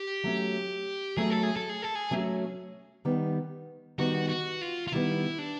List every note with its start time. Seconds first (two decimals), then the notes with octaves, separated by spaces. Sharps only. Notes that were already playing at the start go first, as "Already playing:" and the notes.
Already playing: G4
0.24 F#3 A3 C#4
1.17 F#3 A3 C#4 G#4
1.30 A4
1.43 G#4
1.56 A4
1.69 G#4
1.82 A4
1.95 G#4
2.11 F#3 A3 C#4
3.05 D#3 G3 B3
3.98 D#3 G3 B3 F#4
4.29 F#4
4.61 F4
4.87 F4
4.92 D#3 G3 B3 E4
5.39 D4